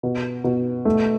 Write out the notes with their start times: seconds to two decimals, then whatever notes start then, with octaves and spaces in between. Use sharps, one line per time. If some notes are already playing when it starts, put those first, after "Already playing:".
0.03 B2
0.44 B2
0.85 A3